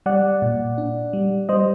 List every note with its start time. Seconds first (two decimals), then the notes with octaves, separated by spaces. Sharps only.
0.06 G3 D5 F#5
0.42 A#2
0.78 D4
1.13 G3
1.49 G3 C5 D#5